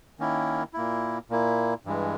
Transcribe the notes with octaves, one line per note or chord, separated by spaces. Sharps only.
D#3 A#3 C#4 E4
A#2 A#3 E4
A#2 A#3 E4
G2 E3 G#3